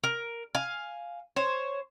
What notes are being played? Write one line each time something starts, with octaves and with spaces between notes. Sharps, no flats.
A#4
F5 G#5
C5 C#5